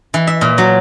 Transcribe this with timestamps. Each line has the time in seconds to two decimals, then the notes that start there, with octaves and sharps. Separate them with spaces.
0.14 E3
0.27 E5
0.41 A#2
0.58 F#3